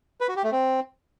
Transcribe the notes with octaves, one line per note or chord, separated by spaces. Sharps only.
B4
F#4
G4
A3
C4